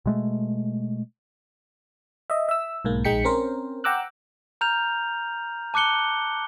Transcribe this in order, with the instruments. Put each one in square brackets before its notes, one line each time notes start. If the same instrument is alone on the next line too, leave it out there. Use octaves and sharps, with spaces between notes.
[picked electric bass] B2 G#3 A3
[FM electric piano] D#5 E5
E5 E6
B1 G#2 A#3
A#1 G#3 D#4 G5 B6 C#7
C4 C#4 A#4 C5
F#5 G5 A#5 D6 E6 F#6
[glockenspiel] A#5 F6 G6 F7
A5 D6 F#6 C#7 G7